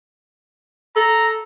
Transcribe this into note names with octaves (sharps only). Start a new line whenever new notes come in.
A4 A#5